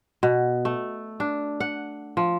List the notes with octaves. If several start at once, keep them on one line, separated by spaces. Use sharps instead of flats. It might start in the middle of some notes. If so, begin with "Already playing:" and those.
B2
A3
D4
F#5
F3